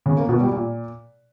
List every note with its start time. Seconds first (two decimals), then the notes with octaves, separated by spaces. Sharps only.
0.06 C#3
0.17 A#3
0.29 B2
0.40 G3
0.52 A#2